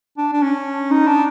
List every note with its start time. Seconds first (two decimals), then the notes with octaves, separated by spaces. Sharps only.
0.18 D4
0.33 D4
0.42 C#4
0.91 D#4
1.07 D4